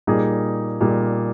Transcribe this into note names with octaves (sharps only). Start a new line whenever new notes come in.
A#2 G3 A#3 D#4 G#4
A#2 G3 A#3 D#4 G#4